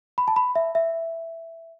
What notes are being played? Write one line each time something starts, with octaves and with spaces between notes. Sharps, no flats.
B5
A5
B5
E5
E5